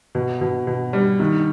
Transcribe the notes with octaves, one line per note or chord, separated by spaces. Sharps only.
B2
B2
B2
G3
D#3